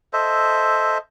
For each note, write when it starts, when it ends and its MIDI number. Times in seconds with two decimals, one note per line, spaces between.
0.13 0.98 69
0.13 0.98 72
0.13 0.98 75
0.13 0.98 76